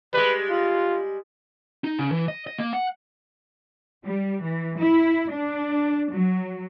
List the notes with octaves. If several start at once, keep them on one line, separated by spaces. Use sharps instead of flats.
G3 G#3 B4
F4
D#4
C#3
E3
D#5
D#5
A#3
F#5
G3
E3
E4
D4
F#3